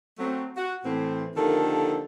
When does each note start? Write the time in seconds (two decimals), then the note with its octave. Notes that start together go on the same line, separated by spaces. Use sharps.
0.19 F#3 A3 C4
0.57 F#4
0.85 A2 E3 C4
1.36 D3 D#3 F3 A#3 G4 A4